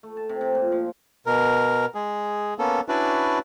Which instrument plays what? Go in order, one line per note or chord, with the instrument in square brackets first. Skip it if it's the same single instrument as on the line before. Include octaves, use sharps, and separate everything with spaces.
[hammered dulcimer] A3
A5
C3
C3
A#2
F3
[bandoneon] B2 A#4
G#3 G#4
A#3 B3 C#4 A4
C#4 D4 E4 F#4 B4 D5